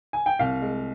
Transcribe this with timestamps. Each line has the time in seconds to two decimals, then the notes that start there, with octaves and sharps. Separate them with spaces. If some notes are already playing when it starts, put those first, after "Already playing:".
0.13 G#5
0.26 G5
0.39 C2 F5
0.62 G#3